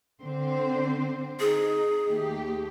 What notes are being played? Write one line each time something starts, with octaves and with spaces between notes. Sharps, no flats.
D3 C4 C5
D#4 G#4
D#2 A3 G4